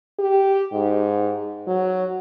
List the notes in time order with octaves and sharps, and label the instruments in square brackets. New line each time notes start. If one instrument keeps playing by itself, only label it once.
[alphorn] G4
G#2
F#3